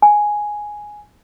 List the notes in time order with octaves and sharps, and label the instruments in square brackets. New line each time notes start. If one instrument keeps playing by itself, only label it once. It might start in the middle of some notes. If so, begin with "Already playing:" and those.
[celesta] G#5